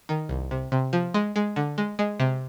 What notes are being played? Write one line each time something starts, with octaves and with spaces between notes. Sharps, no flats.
D#3
C2
C3
C3
F3
G#3
G#3
D3
G#3
G#3
C3